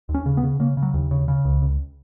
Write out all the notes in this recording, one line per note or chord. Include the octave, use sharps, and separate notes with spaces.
D#2
C#4
C#3
B3
C#3
C#3 A#3
C#3
F#3
D#2
C#3
C#3
C#2
C#2